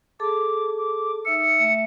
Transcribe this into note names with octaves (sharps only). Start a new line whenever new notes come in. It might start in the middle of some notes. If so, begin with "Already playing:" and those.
G#4 A4 A5 D6
D6
D#4 E5 E6 C#7
A3 E5